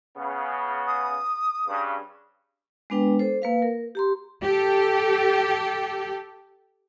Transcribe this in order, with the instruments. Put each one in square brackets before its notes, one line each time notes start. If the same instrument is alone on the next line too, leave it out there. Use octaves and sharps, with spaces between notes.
[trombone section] C#3 B3
[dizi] D#6
[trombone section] G2 C#3
[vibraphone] G#3 B3 D4 B4 G5
A4 C5
A#3 B4 F5
A#4
G4 A#5 C6
[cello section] G4 A4